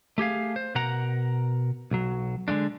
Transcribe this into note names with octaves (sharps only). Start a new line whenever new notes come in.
A3 G4 G#4 F5
C5
B2 A#4 F#5 A#5
B1 F#3
D3 G#3 A3 D4